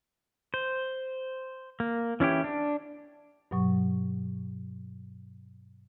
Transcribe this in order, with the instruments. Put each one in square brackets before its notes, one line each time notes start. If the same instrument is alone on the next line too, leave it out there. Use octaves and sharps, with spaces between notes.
[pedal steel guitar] C5
A#3
E3 C#4 E4 G4
D4
[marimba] G2 B2 F#3 C#6